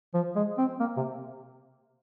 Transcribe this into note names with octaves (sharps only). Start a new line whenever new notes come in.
F3
G#3
C4
A#3
C3